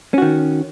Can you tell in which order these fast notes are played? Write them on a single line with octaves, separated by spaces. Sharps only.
C#4 F#4 D#3